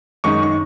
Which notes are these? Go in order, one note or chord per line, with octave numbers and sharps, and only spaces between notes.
F#2 D#3 G#3 D#4 C#6
C#6